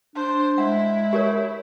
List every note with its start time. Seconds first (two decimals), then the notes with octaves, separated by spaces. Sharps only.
0.15 D4 C5
0.58 G#3 E4 F#5
1.13 G4 A#4 C#5